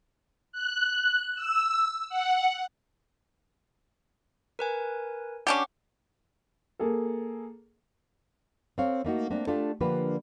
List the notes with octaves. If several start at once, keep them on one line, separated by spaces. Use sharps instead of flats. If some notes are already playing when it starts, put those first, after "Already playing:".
F#6
E6
F#5
A#4 B4 G#5
C#4 D4 G4 F#5
A#3 G#4 A4
C4 A4 C#5 F5
A3 A#3 D#4 F#4
A3 A#3 C4 D4
A3 D4 F4 G4 A4
D3 F3 A#3 D4 G4 B4